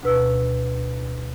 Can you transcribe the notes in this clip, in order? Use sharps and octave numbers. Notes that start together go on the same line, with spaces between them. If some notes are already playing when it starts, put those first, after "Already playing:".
D2 B2 B4 E6